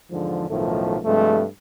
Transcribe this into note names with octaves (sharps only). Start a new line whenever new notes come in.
E2 G#2 D3 F3
B1 F#2 A2 D#3 F3 A3
G2 C3 F3 G#3 A3